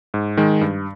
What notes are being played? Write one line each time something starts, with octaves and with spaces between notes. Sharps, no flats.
G#2
D#3 G#3
G2